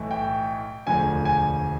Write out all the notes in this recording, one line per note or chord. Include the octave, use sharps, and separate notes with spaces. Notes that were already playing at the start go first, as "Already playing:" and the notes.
Already playing: B1 A2 E3 A3
G5
E1 D2 D3 F3 G#5
G#5